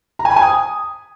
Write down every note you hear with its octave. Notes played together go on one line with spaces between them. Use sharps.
A#5
G#5
B5
G#5
D#6